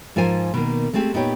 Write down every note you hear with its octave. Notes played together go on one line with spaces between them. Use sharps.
G#2 F3 F4 A#4 C5 G#5
B2 D#3 A#3
G#3 A3 C4 G4 G#4
A#2 B3 D#4 G4 C#5